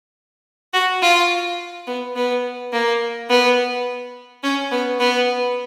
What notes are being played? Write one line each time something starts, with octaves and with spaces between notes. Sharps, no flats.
F#4
F4
B3
B3
A#3
B3
C#4
B3
B3